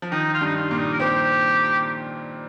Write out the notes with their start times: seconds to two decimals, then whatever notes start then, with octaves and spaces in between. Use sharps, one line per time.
0.02 F3
0.12 D#3 D#4
0.34 F4
0.41 G2 G3 D#4
0.56 F4
0.71 A#2 A#3
0.78 D#4
0.93 A#4
1.00 C4 G4 C5